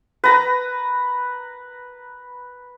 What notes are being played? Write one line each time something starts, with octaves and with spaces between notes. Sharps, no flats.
B4 A#5